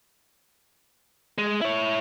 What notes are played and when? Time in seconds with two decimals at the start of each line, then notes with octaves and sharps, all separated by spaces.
1.38 G#3
1.61 E4 C#5